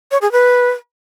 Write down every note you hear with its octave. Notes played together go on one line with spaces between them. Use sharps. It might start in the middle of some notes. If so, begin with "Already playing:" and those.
C#5
G#4
B4